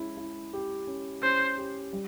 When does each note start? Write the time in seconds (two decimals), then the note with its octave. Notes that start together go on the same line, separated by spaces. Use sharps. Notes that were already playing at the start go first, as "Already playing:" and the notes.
Already playing: G#3 C#4 E4
0.17 E4
0.53 G4
0.87 C#4
1.23 C#4 C5
1.58 G4
1.93 G3